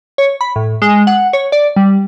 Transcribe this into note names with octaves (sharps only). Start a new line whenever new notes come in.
C#5
B5
A2
G#3
F#5
C#5
D5
G3